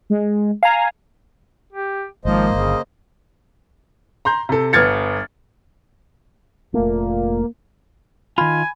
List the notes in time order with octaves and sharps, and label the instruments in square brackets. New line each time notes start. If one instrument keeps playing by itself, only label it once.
[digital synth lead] G#3
[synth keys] F5 A#5 [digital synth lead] G#5
[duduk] G4
[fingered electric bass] G#1 G#2 [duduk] F3 [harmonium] A#3 C5 D#5
[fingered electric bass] G1 [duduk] C#3
[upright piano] A#5 C6 G6
C3 A4
G1 B3 F6 G#6 A6 C#7
[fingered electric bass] F1 A3 [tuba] A#2 [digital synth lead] A#3
[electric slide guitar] D#3 F4 [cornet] G#5 [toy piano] B5